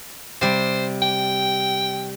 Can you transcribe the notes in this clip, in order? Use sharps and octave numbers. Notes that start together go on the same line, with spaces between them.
C3 G3 C5
G5